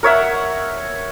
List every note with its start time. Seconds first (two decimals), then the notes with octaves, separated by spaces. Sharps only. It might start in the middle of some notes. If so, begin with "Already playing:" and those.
0.03 A#4 C#5 E5 F#5